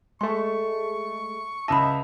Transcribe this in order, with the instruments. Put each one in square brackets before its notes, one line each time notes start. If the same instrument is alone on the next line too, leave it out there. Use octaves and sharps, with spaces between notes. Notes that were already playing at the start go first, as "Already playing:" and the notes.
[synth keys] G#3 A3 [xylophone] C6 [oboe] C#6
[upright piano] C#2 E7 [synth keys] D#5 [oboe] E5 [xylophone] A5 B5